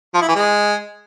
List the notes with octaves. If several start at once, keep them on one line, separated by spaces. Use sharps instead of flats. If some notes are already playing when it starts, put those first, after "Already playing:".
F3
E4
E3
G#3